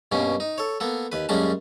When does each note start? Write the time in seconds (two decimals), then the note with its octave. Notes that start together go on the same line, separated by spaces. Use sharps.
0.12 G2 B2 A#3 C#4
0.40 D#4
0.58 A4 C#5
0.80 A#3 B3 A4
1.12 D#2 B4
1.29 F#2 G3 G#3 A#3 C#4 A5